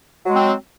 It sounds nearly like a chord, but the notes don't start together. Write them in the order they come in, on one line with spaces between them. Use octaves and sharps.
F#3 G#3 C4